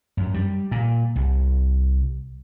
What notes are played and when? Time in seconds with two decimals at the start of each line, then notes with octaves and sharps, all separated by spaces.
0.17 F#2
0.34 G3
0.71 A#2
1.16 C2